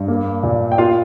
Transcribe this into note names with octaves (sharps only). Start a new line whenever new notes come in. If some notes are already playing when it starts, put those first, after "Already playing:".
Already playing: G2
A#3
A#2
G5
A#3 F4 F5